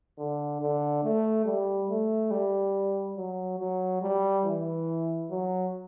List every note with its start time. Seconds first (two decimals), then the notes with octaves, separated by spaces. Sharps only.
0.19 D3
0.61 D3
1.03 A3
1.46 G3
1.90 A3
2.31 G3
3.17 F#3
3.60 F#3
4.02 G3
4.45 E3
5.31 F#3